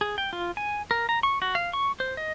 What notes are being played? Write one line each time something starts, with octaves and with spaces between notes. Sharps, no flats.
G#4
G5
F4
G#5
A#4
A#5
C#6
F#4
F5
C#6
C5
D#5